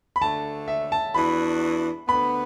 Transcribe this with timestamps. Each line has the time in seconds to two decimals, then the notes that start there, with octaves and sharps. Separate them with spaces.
0.16 B5
0.21 D2 D3 A3 A5
0.68 E5
0.92 A5
1.15 E2 E3 D4 F#4 B5
2.08 D2 D3 B3 B5